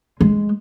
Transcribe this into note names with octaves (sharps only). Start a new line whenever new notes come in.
G#3